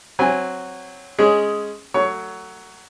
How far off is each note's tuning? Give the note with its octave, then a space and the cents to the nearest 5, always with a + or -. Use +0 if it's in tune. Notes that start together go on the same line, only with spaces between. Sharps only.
F#3 +0 C4 +0 G#5 -20
G#3 +5 C#4 +0 G#4 +0
F#3 +10 A3 +30 C#5 +15